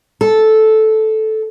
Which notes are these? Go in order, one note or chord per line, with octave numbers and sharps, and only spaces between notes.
A4